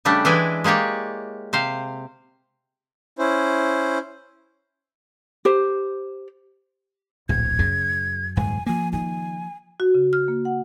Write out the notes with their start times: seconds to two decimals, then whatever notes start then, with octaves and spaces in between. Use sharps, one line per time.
0.05 C#3 G3 A3 D4
0.25 E3 G#3 E4 D5 G5 G#5
0.64 G#3 A#3 G4 C#5 D5
1.53 C3 C5 F5
3.19 C#4 E4 C5
5.45 G4 C5
7.29 D1 A#1 G#6
7.59 F#2 C#3
8.37 D#1 G#2 G#5
8.66 F3 A#3 G#5
8.93 D#3 G#5
9.80 F#4
9.95 C#3
10.13 F6
10.28 A#3
10.45 F#5